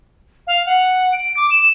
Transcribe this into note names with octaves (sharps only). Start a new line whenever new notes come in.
F5
F#5
D7
D6
E7